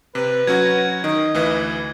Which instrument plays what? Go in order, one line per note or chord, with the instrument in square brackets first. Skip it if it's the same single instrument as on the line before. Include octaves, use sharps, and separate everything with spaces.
[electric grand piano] C3 [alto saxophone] B4
[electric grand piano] F#3 C#4 F#4 [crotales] G#6
[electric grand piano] D#3 [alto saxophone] D#4
[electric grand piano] D2 E3 B4